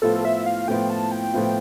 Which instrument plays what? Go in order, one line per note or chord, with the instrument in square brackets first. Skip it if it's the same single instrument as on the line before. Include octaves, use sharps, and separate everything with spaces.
[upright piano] A2 F3 B3 F4 [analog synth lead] A4
[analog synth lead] E5
F5
[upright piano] A2 F3 B3 F4 [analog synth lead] G5
[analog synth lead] A5
G5
[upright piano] A2 F3 B3 F4